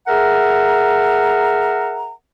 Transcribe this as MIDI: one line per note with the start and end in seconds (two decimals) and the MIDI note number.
0.07 2.11 68
0.07 2.11 70
0.07 2.11 76
0.07 2.11 78
0.07 2.11 82